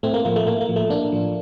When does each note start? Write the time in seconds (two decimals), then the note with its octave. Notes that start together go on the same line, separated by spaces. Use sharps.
0.03 A2 A3 C4
0.14 A#3
0.25 F3 A#3
0.36 A3
0.47 A2 A#3
0.61 A#3
0.69 F3
0.76 A3
0.90 A2 A#3 D4
1.12 F3